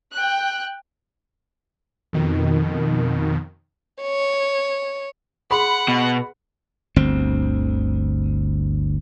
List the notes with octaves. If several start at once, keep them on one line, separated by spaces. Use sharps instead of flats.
G5 F#6
F2 B2 D#3
C#5
G#4 F#5 B5 C6 D#6
B2 B4
G1 D2 C4